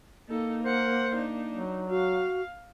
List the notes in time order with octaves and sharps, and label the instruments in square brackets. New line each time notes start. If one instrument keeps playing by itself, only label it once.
[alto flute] A#3 [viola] D#4 A4
[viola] A#4 F#5 [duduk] C5
[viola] D4 D#4
[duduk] F#3
[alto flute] F#4 [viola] F5